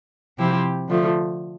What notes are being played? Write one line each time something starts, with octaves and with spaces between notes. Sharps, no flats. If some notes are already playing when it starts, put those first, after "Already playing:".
C3 F3 C4 E4 G4
D3 F3 A3